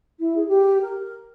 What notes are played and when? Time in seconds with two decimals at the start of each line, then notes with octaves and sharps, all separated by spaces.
0.19 E4
0.36 G#4
0.48 G4
0.81 A#4